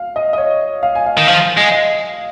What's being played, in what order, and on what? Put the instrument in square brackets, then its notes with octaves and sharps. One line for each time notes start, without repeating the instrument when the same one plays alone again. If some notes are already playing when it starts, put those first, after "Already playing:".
Already playing: [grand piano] F5
D#5
D#5
C#5
F5
G#5
F5
[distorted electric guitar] D#3
[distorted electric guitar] F3 [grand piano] F5
[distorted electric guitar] G#3
[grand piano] D#5